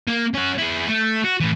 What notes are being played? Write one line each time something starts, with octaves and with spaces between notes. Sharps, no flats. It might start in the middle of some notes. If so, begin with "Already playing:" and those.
A#3
C#4 F#4
E4 G#4
A3
F#4
A2 E3